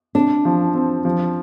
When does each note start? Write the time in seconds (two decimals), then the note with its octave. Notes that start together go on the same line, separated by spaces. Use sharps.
0.15 C3 D4
0.45 F3
0.75 C4
1.05 F3